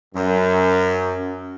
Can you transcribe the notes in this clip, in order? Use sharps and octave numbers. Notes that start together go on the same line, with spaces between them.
F#2